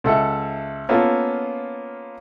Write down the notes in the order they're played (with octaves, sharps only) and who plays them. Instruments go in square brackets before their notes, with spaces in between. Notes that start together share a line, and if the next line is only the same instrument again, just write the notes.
[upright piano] C#2 A4 E5 F#5
A#3 B3 C#4 F4 A4